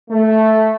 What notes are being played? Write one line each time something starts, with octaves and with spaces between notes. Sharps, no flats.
A3